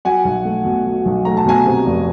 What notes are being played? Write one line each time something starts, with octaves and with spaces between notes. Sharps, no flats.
F#3 F#5 G#5
B1
A3
B2
F#3
B1
A3 A#5
A5
B2 G#5 A#5
C3
F1